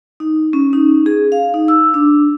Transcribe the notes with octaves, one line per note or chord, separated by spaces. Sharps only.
D#4
C#4
D#4
G#4
F5
D#4
E6
D4